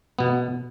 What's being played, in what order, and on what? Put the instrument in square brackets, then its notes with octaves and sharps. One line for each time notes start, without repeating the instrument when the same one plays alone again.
[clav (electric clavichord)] B2 B3